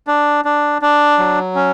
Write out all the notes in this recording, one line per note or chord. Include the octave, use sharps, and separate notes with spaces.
D4
D4
D4
F#3
C#4